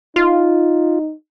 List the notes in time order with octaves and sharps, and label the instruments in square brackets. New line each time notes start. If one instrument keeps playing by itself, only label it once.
[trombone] D#4 [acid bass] F4